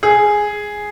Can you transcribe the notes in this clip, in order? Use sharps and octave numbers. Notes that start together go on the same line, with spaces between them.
G#4